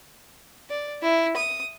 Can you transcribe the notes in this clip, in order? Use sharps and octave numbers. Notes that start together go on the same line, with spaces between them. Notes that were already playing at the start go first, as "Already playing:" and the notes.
D5
E4
D#6